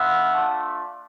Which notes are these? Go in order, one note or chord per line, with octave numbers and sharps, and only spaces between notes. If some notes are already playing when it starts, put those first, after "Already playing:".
Already playing: B3 D4 F4 E5 F#5
A3 D4 F4